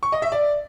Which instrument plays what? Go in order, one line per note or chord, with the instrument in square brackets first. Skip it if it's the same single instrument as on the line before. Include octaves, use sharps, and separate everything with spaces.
[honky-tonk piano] C#6
D#5
E5
D5